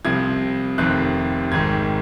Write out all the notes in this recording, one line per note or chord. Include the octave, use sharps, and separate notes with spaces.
C2 C3 F3 G#6
F1 F2 C3 D#3 F#6
G#1 G#2 D#3 G#6